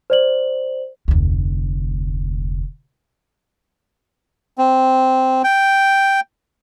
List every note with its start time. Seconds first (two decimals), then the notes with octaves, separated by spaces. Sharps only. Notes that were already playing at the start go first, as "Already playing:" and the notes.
0.10 C5 D5 F#7
1.08 F1 D2
4.58 C4
5.44 G5